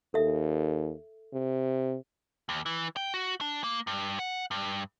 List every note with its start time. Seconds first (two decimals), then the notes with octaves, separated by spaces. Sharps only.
0.14 D#2 A4 E5
1.33 C3
2.49 D#2
2.66 E3
2.96 G5
3.14 F#4
3.41 D4
3.64 A#3
3.87 G2
4.19 F#5
4.51 G2